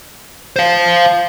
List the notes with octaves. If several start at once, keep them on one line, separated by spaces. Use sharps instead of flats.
C5 F5